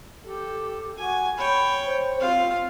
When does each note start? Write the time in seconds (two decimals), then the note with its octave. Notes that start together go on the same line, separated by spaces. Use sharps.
0.25 G4 A4
0.98 F#4 G#5
1.38 C#5 G5 B5
1.86 C5
2.20 C4 F4 F5